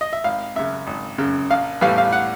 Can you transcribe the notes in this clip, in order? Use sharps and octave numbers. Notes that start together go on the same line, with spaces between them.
D#5
E5
G#1 F5
F#2 C#3 E5
G#1
F#2 C#3
A#1 F5
A2 E3 G3 B3 F5
F5
F#5